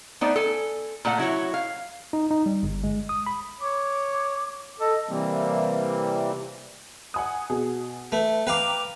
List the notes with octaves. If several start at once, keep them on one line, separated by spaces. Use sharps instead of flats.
A3 B3 D#4 C5 D5
A4 G#5
A#2 A3 D5 F#5
F#3 E4 F#4 C#5
F5
D#4
D#4
G3
G1
G#3
D#6
B5
C#5 D6
A4 D#5
C3 E3 G3 A#3 C4
F#5 G#5 D#6
B2 G#4
A3 B4
B4 F5 G5 A#5 D6